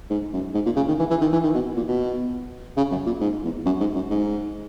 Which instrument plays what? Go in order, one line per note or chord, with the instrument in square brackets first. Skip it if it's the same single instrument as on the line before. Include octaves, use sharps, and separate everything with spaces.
[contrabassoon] G#2
F#2
G#2
A#2
C#3
D#3
E3
E3
D#3
E3
D#3
B2
A#2
B2
C#3
F#2
A#2
G#2
E2
F#2
G#2
F#2
G#2